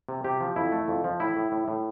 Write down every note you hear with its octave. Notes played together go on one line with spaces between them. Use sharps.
C3
C3 G4
F3
F2 E4
A3
F2
F3
A2 E4
A2
A2
A2